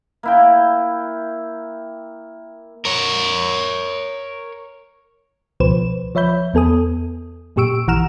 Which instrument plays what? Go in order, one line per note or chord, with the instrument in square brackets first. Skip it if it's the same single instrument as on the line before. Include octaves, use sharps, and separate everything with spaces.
[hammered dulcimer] A#3 E4 G5
[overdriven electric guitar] A#4 C#5
[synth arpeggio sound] C#2 B2 F3 B4 C5 E7
F3 C#5 E5 B5 G6
E2 B3 A4 G#5 D#6
F#2 A#2 G4 C#6 E6 D7
A#1 E3 F#5 A#5 F6 E7